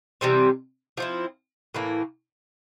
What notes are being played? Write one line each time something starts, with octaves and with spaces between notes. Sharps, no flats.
C3 E3 G3 C4
F3 C4 E4
A2 E3 A#3